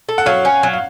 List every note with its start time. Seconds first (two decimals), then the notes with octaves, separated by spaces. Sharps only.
0.09 A4
0.18 F#5
0.26 F#3 C#5 F5
0.45 C#4
0.63 F#3
0.73 F5